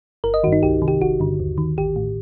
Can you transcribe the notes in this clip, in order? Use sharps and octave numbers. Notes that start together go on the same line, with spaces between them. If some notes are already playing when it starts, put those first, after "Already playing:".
G1 A#4
D#5
G2 D#3 F#4
D#4
C2 G4
C3 D#3
G4
G1 F#4
G2 D3
D#2
D#3
A1 G4
A2